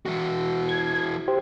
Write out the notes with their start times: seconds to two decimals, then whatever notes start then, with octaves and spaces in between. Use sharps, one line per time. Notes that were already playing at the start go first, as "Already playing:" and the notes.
0.05 E3 F#4
0.69 G#6
1.28 G4 C5